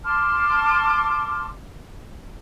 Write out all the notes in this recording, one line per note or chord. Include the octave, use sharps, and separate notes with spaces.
A5 C6 D6 F6